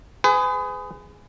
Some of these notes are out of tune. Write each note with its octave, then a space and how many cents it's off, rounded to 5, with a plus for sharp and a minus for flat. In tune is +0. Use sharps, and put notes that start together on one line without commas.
G#4 +0 B4 +40